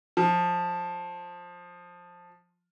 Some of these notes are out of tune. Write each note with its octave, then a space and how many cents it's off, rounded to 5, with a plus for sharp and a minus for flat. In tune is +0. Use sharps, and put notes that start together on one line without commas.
F3 +15